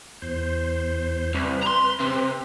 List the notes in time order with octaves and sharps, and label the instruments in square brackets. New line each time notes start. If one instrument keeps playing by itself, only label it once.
[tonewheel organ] E2 C5
[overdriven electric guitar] C2 [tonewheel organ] B4
[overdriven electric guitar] A#5 C6
C3